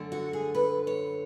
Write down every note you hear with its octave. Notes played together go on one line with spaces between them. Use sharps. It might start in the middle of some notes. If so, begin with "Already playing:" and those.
Already playing: F#2 D3 A3
F#4
G#4
B4
C#5